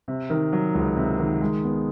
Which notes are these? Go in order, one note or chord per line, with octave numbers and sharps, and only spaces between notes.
C3
D#3
F#3
C#2
C3
D#3
G#3
B3